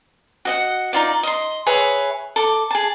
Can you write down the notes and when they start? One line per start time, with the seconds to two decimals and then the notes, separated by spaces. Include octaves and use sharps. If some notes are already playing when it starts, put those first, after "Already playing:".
0.45 F#4 D#5 F#5
0.93 D#4 F4 D5
1.23 D#5 C6
1.66 G#4 B4 C#5 E5
2.36 A4 D6
2.71 G#4 A5